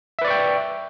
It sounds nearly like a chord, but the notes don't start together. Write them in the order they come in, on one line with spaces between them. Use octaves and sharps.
E5 B4 D5 C#6 G5